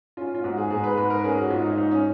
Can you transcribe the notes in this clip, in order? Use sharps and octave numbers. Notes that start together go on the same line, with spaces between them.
C#4 F4
F4
G#2 F#4
G#4
G#2 G#4
B4
G#2 B4
A#4
C#4 G#4
F#4
G#2 F4
D#4
G#2 D#4
C#4